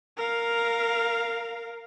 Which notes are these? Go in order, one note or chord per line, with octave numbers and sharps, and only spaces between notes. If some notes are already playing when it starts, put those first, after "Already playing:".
A#4 F5